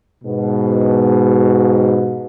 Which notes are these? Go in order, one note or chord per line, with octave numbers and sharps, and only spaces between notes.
G#2 B2